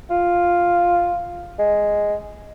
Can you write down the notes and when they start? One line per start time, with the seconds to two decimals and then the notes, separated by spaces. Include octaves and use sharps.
0.10 F4
1.59 G#3